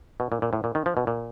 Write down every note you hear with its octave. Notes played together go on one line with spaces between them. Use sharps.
B2
A#2
A#2
A2
A#2
D#3
F3
B2
A#2